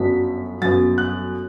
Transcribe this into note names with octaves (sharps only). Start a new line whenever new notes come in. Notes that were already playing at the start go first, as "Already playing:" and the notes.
Already playing: G1 F#2 F#3 B3 D4 B6
G1 F#2 F#3 B3 A6
F#6